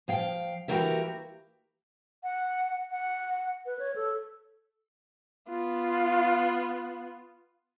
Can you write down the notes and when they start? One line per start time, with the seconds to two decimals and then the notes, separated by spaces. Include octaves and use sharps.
0.08 F3 F5 G5
0.68 E3 A#3 F#4 G4 A#4 E5
2.23 F#5
2.91 F#5
3.66 B4
3.79 C#5
3.96 A4
5.49 B3 F4